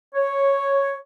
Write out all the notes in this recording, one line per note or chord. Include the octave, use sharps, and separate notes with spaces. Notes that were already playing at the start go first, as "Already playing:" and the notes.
C#5